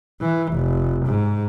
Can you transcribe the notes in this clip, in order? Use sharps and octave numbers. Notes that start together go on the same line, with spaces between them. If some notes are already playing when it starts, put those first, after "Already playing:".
E3
F1
G#2